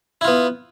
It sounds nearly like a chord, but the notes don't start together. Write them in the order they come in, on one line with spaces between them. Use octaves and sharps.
E4 F4 B3